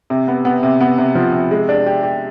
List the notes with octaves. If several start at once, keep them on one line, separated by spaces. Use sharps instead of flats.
C3
B3
B3
C3
B3
C3
F3
C3
G#3
D4
G4
G4